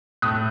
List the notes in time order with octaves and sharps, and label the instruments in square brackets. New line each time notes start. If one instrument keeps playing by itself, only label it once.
[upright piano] A2 A3 D#6 F#6